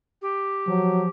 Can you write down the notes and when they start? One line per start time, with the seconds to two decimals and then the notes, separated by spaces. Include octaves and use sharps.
0.21 G4
0.68 F3 F#3